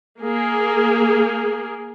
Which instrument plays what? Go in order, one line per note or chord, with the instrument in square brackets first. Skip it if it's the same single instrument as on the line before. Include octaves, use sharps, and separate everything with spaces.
[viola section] A#3 G#4